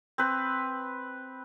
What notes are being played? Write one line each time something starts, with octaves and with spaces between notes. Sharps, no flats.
C4 B4